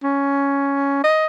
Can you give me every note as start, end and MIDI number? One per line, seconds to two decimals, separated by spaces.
0.04 1.01 61
1.04 1.26 75